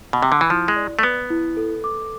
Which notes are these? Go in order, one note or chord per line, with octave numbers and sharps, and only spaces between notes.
B2
C3
D3
E3
F3 E4
G#3
D5
A3
B3 B4
E4
A4
D6